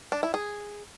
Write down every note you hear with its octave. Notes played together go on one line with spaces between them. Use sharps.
D4
E4
G#4